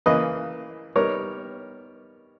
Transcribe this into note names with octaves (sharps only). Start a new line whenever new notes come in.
C#3 E3 A#3 B4 D#5
G3 B3 D#4 A#4 C#5